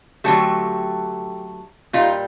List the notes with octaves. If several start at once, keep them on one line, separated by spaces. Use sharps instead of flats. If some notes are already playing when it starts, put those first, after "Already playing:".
D3 F#3 A3 G4 A4
A#2 G3 D#4 F4